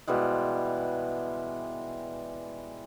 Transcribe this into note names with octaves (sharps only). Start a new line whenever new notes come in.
B2 E3 G3 G#3